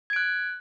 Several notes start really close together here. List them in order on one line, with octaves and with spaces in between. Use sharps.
G#6 D7 F#6